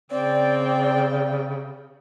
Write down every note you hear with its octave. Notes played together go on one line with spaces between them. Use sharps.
C#3 C4 D5 G5